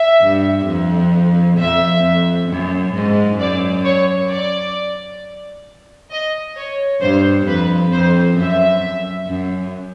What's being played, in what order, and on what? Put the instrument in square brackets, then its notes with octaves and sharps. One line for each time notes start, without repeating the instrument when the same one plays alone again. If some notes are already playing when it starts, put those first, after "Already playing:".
Already playing: [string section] E5
[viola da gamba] G2
F2
[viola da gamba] F2 [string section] E5
[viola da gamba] F2
F#2
G#2
[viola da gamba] F#2 [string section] D5
[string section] C#5
D5
D#5
C#5
[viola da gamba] G2 [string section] C5
[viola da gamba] F2 [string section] B4
[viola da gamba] F2 [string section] C5
[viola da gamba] F#2 [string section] E5
[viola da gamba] F#2